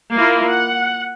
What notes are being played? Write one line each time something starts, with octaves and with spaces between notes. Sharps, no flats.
A#3 E4 F4 A#4
F#5